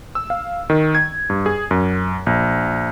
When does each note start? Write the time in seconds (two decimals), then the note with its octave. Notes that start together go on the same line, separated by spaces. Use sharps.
0.15 E6
0.30 F5
0.70 D#3
0.95 G#6
1.30 G2
1.46 G#4
1.71 F#2
2.26 A#1